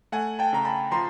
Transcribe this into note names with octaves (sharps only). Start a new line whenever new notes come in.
A3 F#5 G#5
G5 A5
C#3 A#5
A5 B5
F3 A#5 C6